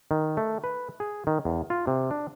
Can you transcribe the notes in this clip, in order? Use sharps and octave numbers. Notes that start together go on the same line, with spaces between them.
D#3
A3
B4
G#4
D#3
E2
F4
C3
D4